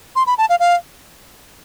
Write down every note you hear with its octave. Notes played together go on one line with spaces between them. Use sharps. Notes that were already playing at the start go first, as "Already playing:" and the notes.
C6
B5
A5
F5
F5